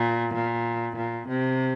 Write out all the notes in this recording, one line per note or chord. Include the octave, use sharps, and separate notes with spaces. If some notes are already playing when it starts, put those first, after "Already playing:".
Already playing: A#2
A#2
A#2
C3